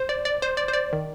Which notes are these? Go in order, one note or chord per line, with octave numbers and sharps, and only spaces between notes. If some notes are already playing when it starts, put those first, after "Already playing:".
Already playing: C5
D5
D5
C5
D5
C5
D5
D#3